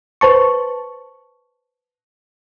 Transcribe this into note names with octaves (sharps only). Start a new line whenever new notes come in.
B4 C5 A5 C#6